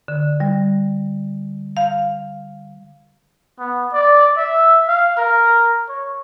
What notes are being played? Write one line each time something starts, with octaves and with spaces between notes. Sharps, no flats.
D3
G3
F5
B3
D5
E5
F5
A#4
C#5